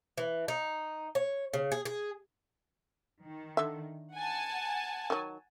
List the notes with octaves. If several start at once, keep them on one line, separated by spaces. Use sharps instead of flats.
E3
D#4
C#5
C#3
G#4
G#4
D#3
D3 E5
F#5 G#5 A5
D#3 F#3